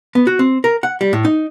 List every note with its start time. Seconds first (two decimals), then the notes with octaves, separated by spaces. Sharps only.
0.15 B3
0.27 F#4
0.39 C4
0.64 A#4
0.83 F#5
1.01 G3
1.13 A2
1.25 D#4